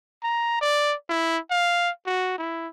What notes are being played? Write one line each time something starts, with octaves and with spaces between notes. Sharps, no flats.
A#5
D5
E4
F5
F#4
E4